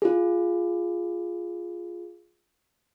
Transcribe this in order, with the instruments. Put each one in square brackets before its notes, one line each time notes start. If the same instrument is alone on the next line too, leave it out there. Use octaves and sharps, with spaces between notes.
[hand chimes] F4 G#4